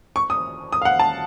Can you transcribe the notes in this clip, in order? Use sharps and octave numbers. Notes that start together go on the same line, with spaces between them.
C#6
D#6
D#6
F5
F#5
A5